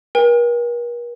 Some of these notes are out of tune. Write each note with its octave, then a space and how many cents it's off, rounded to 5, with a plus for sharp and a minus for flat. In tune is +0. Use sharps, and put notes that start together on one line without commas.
A#4 +45 G5 +45